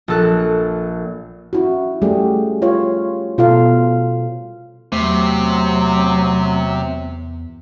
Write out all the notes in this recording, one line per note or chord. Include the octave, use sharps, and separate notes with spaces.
A#1 A4 F#6
C#4 E4 F#4
G3 A3 C#4 G4 G#4
F4 C#5 F5
B2 F4 A4 F5
E2 C3 F#3 A3